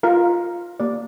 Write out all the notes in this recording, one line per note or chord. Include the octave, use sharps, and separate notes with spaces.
F4 A#4 F5
A#3 G4 D5